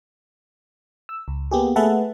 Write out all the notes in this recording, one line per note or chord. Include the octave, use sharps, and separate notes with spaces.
E6
C#2
A#3 B3 G4 G#4
A3 G#4 B4 E5 F#5 A5